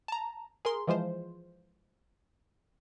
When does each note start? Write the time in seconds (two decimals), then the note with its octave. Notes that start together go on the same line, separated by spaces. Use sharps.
0.08 A5 A#5
0.65 G#4 A#4 C6
0.87 E3 F3 G#3 F4 C5